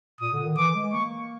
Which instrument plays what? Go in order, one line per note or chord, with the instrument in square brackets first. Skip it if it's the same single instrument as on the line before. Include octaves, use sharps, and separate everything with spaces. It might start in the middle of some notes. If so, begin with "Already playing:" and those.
[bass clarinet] A#2 [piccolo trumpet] D#6
[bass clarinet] D3
D#3
[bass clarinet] E3 [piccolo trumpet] D6
[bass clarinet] G#3
[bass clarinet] A#3 [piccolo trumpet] C#6